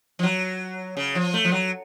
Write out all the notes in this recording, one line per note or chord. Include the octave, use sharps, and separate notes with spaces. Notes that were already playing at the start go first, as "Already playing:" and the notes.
F3
F#3
C#3
F3
A3
F3
F#3